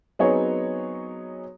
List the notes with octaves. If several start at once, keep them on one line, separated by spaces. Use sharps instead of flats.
F#3 B3 C4 D#4 G#4 C#5